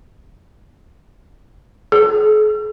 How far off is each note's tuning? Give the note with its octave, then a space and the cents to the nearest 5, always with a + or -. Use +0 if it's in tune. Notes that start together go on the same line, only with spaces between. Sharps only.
G#4 +45